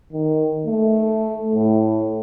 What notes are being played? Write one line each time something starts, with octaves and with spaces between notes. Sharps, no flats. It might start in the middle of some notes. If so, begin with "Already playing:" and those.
D#3
A3
A2